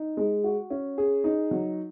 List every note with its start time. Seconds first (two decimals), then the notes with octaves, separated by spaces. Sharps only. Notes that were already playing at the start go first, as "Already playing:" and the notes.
Already playing: D#4
0.17 G#3
0.44 F#4
0.70 C#4
0.98 G#4
1.24 D#4
1.51 F#3